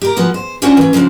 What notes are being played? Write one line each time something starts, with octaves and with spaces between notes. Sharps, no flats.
G4 A#4
F3 G#3 B3 F#4
C5
C#4 D4 F4 F#4 C5 C#5
E3 C#4
C#3 F3 C4 D4